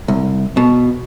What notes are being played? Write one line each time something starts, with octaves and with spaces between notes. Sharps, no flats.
C2
B2